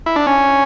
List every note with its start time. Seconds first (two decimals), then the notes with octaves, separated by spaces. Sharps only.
0.06 E4
0.16 D4
0.27 C#4